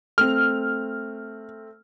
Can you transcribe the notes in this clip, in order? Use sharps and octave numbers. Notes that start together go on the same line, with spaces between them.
A3 C4 F6